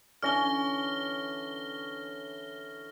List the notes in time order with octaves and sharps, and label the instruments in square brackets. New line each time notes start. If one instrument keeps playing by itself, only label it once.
[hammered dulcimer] D3 E3 C#4 [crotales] F6 A#6 G7